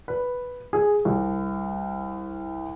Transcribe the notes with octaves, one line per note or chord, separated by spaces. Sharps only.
B4
G#4
C2